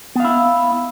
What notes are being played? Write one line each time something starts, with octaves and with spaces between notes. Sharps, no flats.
B3 E4 F5